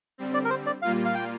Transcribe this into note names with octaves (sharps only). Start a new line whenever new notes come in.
D3 G3 C4
D5
A#4
C5
D5
A#2 G3 A#3 F4 F5
F5
G5